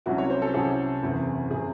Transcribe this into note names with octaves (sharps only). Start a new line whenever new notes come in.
C2 C3 F#3 C#4 E4 F#4
C#5
C5
A4
C2 C3 F#3 C#4 E4 G#4
F#1 E2 C3
C3 G#4